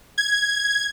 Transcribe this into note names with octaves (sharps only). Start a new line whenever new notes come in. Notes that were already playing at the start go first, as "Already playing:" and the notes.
G#6